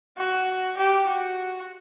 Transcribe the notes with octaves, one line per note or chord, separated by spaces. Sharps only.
F#4
G4
F#4